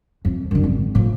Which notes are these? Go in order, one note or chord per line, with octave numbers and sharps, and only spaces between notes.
F2
F#2 D3
G#1
A2 F3